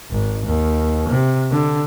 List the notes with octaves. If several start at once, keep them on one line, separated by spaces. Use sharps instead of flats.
G#1
D#2
C3
D3